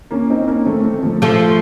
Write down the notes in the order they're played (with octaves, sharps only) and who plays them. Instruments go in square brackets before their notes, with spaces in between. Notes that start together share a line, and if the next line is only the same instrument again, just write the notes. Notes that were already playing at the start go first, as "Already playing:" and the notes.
[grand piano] A#3 C#4
C4 D#4
A#3 C#4
A3 C4
A3 C4
F3 A3
[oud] F3 A3